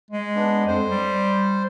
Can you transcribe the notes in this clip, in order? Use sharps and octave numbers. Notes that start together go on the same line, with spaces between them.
G#3
B3 D4
F2 C5
G3